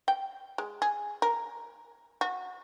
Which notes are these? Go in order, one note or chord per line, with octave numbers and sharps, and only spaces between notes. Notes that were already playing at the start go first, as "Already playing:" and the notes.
G5
G#3
G#4
A#4
F#4